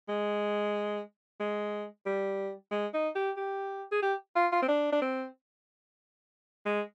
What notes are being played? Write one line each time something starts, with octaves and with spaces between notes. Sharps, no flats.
G#3
G#3
G3
G#3
D#4
G4
G4
G#4
G4
F4
F4
C4
D4
D4
C4
G#3